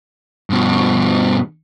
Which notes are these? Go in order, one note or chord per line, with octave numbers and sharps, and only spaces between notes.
G2 B2